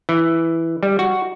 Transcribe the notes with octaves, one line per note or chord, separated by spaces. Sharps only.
E3
G3
F#4